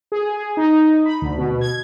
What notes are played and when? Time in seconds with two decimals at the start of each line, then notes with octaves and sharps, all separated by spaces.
0.12 G#4
0.37 G#4
0.57 D#4
1.06 B5
1.22 D2
1.38 B2
1.61 G#6